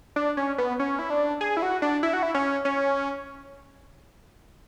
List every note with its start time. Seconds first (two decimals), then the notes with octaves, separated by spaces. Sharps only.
0.16 D4
0.37 C#4
0.58 B3
0.79 C#4
0.99 E4
1.10 D4
1.41 G#4
1.57 E4
1.62 F#4
1.82 D4
2.03 E4
2.13 F#4
2.23 E4
2.34 C#4
2.65 C#4